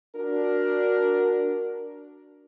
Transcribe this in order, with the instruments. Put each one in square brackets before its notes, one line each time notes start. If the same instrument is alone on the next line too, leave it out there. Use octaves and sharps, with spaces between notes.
[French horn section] D4 F#4 A#4